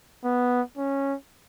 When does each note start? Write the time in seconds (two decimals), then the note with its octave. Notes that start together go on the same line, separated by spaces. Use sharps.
0.24 B3
0.78 C#4